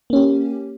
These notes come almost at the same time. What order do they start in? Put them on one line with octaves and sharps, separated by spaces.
A#3 C#4 G4